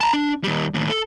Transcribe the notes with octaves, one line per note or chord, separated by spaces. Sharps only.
A5 A#5
D4
D#2 G3
D#2 A2
A4